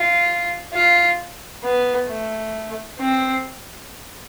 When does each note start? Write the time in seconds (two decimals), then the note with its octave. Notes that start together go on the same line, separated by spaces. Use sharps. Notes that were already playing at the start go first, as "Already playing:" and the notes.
Already playing: F4
0.74 F4
1.64 B3
2.09 A3
3.00 C4